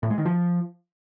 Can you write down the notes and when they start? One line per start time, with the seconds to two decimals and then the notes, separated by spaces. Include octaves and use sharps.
0.03 A2
0.10 G#3
0.18 D#3
0.25 F3